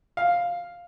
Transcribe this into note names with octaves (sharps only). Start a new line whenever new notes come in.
F5